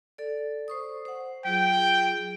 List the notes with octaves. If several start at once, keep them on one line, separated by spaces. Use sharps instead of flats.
A4 D5
C5 C#6 D#6
C5 F#5
F#3 F4 G#4 G5